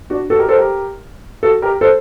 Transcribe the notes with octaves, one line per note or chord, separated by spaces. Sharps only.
D4 F#4
F#4 A4
G4 A#4
A4 C5
G4 A#4
F#4 A4
G4 A#4
A4 C5